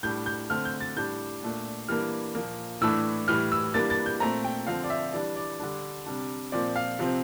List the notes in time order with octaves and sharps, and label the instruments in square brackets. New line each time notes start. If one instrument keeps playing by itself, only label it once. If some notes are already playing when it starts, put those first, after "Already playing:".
[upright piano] A2 G3 D4 G6
G6
D3 A3 C4 F6
G6
A6
A2 G3 D4 G6
A#2 A3 D4
E3 G3 A#3 D4 F6
A#2 F3 A#3
A2 E3 A3 D4 E6
A2 E3 G3 F6
E6
E3 G3 A#3 D4 A6
A6
G6
A#2 A3 C4 A#5
G5
D3 F3 C4 F5
D5
E5
E3 G3 D4 D5
D5
D3 G3 D4
C3 G3 D4
A#2 F3 C4 D5
F5
C3 F3 C4